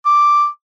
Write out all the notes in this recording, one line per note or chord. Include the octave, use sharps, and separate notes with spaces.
D6